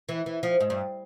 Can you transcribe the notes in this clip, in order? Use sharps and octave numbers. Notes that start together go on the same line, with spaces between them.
E3
E3
F3
G#2
G2